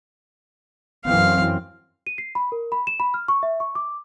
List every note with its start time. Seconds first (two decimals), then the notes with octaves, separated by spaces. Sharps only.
1.05 F#2 E3 C4 F5
2.07 D#7
2.18 C7
2.35 B5
2.52 A#4
2.72 B5
2.87 E7
3.00 B5
3.14 F6
3.28 C#6
3.43 E5
3.60 C#6
3.75 D6